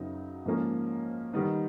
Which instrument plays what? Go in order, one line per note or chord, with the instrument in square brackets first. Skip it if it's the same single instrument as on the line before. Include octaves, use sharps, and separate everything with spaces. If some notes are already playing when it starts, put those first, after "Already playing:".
Already playing: [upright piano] F#2 C#3 F#3 B3 D#4
G#2 F3 A#3 C#4
D#3 G3 B3 D#4